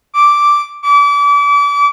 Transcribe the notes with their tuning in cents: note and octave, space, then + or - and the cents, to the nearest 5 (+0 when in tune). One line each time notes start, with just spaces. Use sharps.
D6 -5
D6 -35